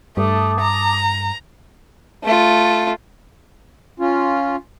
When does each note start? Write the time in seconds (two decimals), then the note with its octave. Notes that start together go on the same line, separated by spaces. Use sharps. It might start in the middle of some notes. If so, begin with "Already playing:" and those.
0.17 G2 A3 A5 D6 D#6
0.61 A#5
2.24 A3 F4
4.00 C#4 F4